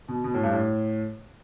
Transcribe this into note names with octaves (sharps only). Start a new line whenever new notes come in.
B2
B2
A2
G2
A2